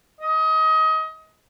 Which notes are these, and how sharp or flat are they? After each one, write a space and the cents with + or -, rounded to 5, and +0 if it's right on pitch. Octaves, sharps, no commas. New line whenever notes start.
D#5 +25